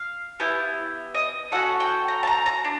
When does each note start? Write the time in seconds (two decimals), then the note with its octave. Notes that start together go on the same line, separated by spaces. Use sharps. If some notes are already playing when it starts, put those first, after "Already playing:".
Already playing: F5
0.40 B3 E4 G4
1.14 D#5
1.52 C#4 F#4 A4 F#5
1.80 G5
2.08 A#5
2.23 A5
2.27 A#5
2.46 A#5
2.64 D4